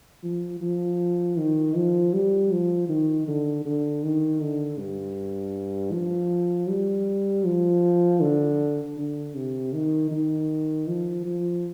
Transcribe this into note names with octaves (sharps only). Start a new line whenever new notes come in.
F3
F3
D#3
F3
G3
F3
D#3
D3
D3
D#3
D3
G2
F3
G3
F3
D3
D3
C3
D#3
D#3
F3
F3